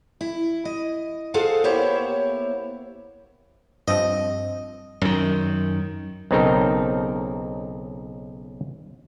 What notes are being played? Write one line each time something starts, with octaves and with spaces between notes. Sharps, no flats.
E4
D#5
F4 G#4 A4 C5 F5 F#5
A#3 B3 E4 G4 C5 C#5
G2 F3 C4 D#5
F#2 D#3
B1 C#3 C4 D#4 A4 A#4